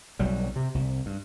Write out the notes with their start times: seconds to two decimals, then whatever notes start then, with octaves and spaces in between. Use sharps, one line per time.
0.19 B1 F#3 G3
0.56 C3
0.74 C2
1.06 G2